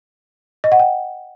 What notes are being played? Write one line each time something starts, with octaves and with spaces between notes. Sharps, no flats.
D#5
F#5
G5